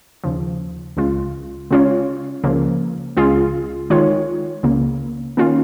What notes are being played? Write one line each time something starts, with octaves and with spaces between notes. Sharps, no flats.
D#2 C#3 F3
C#2 C#3 G#3 F4
C#3 G#3 C#4 F4 C#5
C#2 C#3 F3 A#3
C#2 C#3 G#3 F4 G#4
D#3 G#3 F4 C#5
C#2 C#3 A#3
D#3 A#3 C#4 F4